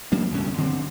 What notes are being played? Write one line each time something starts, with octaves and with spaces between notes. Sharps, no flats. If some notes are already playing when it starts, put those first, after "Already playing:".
F#3 A#3 C#4 D4
C#2 G2 B2 C#4
D3 C4